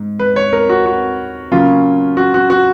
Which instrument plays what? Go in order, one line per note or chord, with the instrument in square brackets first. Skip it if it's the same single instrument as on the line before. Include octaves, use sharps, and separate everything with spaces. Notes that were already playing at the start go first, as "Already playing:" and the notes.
Already playing: [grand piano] G#2
B4
C#5
A#4
F#4
F#4
C#3 F#3 A#3 C#4 F4
F#4
F#4
F#4